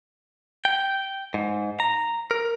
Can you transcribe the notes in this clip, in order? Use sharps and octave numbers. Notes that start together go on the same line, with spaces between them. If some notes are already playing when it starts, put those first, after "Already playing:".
G5
G#2
A#5
A#4